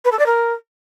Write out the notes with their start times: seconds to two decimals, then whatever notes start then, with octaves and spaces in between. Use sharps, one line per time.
0.05 B4
0.12 A4
0.19 D5
0.26 A#4